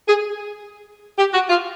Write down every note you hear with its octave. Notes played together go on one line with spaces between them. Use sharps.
G#4
G4
F#4
F4